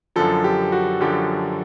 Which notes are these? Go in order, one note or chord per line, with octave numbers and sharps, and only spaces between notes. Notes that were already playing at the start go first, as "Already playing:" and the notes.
F#2 D3 F3 A4
G4
F#4
F#2 D3 F3 G4